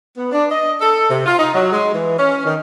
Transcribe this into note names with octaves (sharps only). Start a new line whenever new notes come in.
B3
D4
D#5
A4
C3
F4
D#4
F#3
G#3
E3
C#4
D#3